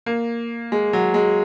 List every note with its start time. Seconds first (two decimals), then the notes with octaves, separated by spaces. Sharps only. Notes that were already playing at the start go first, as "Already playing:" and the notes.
0.06 A#3
0.72 G#3
0.93 F#3
1.14 G#3